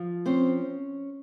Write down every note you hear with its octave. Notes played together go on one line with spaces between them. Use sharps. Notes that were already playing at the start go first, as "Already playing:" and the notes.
Already playing: F3
C4 C#4 C5